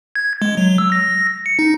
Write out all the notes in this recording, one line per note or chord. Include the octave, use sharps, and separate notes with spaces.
G#6
G#3
F#3
E6
A#6
C#7
D#4